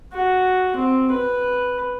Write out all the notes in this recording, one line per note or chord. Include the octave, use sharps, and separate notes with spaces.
F#4
C4
B4